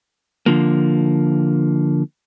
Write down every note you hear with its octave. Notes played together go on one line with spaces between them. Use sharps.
D3 F3 A#3